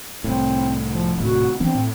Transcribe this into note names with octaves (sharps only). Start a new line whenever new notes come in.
C2 A2 C4
F3
D#1 A2 C3 F#4
E3 B3 C4 D4
A2